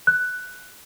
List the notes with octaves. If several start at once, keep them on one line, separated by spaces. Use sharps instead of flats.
F#6